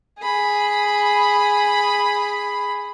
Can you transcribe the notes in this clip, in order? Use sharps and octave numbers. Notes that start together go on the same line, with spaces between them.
G#4 B5